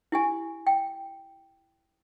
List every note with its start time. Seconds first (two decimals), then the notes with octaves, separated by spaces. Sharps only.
0.12 E4 G4 G#5
0.67 G5